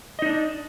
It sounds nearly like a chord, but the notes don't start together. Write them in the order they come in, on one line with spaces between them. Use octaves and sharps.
D#5 D#4 D4